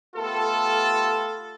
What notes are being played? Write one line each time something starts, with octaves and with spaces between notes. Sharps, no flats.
A3 B3 F4 G4 A4